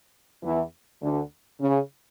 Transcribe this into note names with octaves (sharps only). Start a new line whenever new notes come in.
E2 E3
D2 D3
C#3